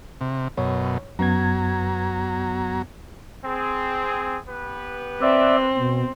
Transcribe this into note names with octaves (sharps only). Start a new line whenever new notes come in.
C3
F#2 B2 C#5
F#2 F#3 B3 A#5 G#6
C4 G#4
B3 G4 B4
C4 D5 E5
B2